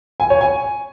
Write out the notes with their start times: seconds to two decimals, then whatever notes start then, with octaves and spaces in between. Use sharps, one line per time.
0.20 G#5
0.30 C#5
0.41 G#5